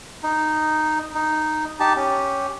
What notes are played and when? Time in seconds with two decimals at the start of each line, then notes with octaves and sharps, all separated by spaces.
0.23 D#4
1.15 D#4
1.80 D#4 G4 A5
1.96 C#4 G4